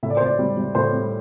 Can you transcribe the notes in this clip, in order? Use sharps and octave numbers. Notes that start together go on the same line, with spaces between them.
A2 E5
D5
C5
A2 D5
G3
G3
A2 C5
G3